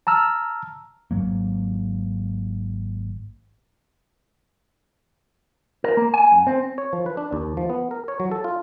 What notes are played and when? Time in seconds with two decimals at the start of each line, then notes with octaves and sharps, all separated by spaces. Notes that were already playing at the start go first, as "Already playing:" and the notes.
0.07 A5 A#5 E6 F6
1.11 G#1 G#2 F#3 A#3
5.84 A#4
5.97 A#3
6.14 G#5
6.32 F#2
6.47 C4
6.78 C#5
6.93 F3
7.06 B4
7.17 D4
7.33 D#2
7.57 F3
7.69 B3
7.91 A#4
8.08 C#5
8.20 F#3
8.32 A4
8.44 F4